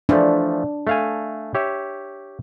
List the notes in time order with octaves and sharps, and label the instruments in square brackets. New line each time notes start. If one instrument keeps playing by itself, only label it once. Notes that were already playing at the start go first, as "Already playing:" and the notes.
[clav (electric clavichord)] E3 F3 A3 [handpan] D4
[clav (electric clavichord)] A3 F5 G#5
G4 C#5 E5